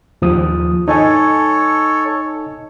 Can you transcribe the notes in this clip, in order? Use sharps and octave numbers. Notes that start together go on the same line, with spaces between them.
D#2 F3 D#6
D#4 A4 C#5 D#5 G#5